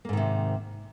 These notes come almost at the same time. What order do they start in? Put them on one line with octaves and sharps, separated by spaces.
A#3 G#2 D#3 C3